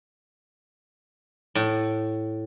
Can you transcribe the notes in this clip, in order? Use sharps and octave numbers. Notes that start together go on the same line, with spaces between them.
A2